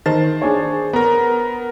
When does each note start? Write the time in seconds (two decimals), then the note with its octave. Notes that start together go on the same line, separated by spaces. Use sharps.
0.06 D#3 C5 A5 A6
0.42 D4 G#4 C#5
0.93 B3 A#4 A#5